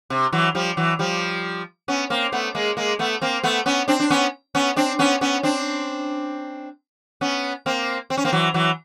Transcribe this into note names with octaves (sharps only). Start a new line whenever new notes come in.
C3
E3 F#3
F3 G3
E3 F#3
F3 G3
B3 C#4
A#3 C4
A3 B3
G#3 A#3
G#3 A#3
A3 B3
A#3 C4
A3 B3
B3 C#4
C4 D4
D4
B3 C#4
B3 C#4
C4 D4
B3 C#4
B3 C#4
C4 D4
B3 C#4
A#3 C4
C4
C#4
A#3 C4
E3 F#3
E3 F#3